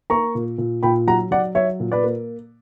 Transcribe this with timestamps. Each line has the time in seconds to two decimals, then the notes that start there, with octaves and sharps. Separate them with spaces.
0.10 A#3 A#5 C#6
0.35 A#2
0.58 A#2
0.83 A#2 G5 B5
1.07 F#3 F#5 A#5
1.31 F#3 D5 F#5
1.55 F#3 C#5 E5
1.80 A#2
1.92 B4 D5
2.04 A#3